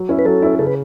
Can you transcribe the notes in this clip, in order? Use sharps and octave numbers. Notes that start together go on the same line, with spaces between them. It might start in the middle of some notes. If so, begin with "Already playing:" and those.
Already playing: F#3
C#4 E4
B4
F#3 A4
C#4 E4
C#3 A4
B4